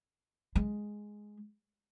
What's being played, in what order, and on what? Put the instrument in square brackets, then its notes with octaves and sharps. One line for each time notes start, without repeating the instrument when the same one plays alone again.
[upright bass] G#3